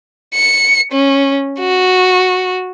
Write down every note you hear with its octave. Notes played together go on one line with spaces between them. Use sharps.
C#7
C#4
F#4